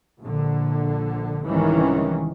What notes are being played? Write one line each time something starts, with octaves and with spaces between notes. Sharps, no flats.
A#1 D3
C2 G#2 D#3 E3 C#4